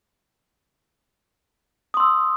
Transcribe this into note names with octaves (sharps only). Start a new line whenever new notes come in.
C6 D#6 E6